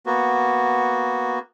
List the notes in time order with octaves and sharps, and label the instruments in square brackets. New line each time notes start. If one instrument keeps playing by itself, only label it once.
[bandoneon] A#3 B3 F#4